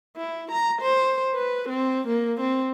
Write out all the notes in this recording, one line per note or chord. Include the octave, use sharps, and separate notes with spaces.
E4
A#5
C5
B4
C4
A#3
C4